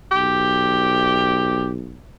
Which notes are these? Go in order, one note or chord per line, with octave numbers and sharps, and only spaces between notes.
B1 G4